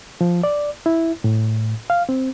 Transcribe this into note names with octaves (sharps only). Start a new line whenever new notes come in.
F3
D5
E4
A2
F5
C4